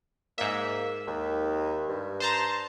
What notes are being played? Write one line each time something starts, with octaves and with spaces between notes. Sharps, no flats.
G#2 A#3 E5
D#2
G2
C5 A5 A#5